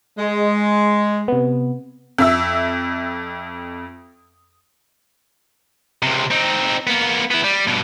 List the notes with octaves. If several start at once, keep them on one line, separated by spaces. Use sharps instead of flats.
G#3
C3 B3
F2 E5 E6
C#2 C3
C4 D#4
A#3 B3
B3 E4
G3
G2 B2